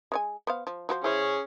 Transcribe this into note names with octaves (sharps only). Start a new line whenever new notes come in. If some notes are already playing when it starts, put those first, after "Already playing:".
G#3 C#5 G#5
B3 C5 F5
F3
F3 F#4 C5
C#4 E4 G#4 C5